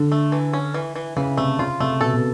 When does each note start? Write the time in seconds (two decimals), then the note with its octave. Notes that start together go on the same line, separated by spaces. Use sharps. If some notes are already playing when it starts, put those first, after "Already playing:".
Already playing: D3
0.12 A3
0.32 E3
0.53 C#4
0.74 E3
0.96 E3
1.16 C#3 E3
1.37 C3 A3
1.59 C#3 F4
1.80 C3 A3
2.01 B2 A4
2.13 B2